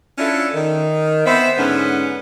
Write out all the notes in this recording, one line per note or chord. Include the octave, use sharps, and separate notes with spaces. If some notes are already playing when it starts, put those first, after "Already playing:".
C#4 D4 E4 F4 A4
D#3
B3 C4 C5 E5
G#2 D3 B3 C#4